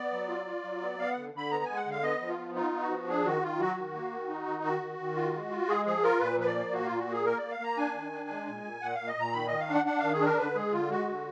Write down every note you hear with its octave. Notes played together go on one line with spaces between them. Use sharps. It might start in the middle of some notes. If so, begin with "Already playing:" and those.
Already playing: B3 D5
F#3
F4
F4
F#3
B3
B3 F5
D3 F#5
D3 B5
B3 A#5
G#3 G#5
F#5
D3 F5
B3 D#5
F3
F4
B3
D#4 F4
B3
F#4
F3
D4 G#4
D#3 F#4
D#3 F4
F#3 F#4
D#3
A#3
D#3
D#4
D#3
D#3 F#4
D#3
D#3
F4
G#3
F4
G#3 G#4
F3 G#4
F4 A#4
A#2 B4
F3 B4
D5
A#3
A#2 F#4
A#2 F4
F#4
A#3
G#4
A#3 A#4
A#3 D5
F5
A#3 A#5
D4 G#5
D#3
D4
G#3
A#2
A#2
A#2 F#5
A#2 F5
D#5
A#2 A#5
D#3 B5
D#3 D#5
F5
D4
F#5
D4 F#5
D#3 F5
G#4
D4 A#4
D3 B4
G#3 G#4
D3 F4
G#3 F#4
D3